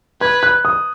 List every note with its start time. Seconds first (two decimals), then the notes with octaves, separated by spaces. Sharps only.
0.21 B4 G#6
0.43 F#6
0.65 D#6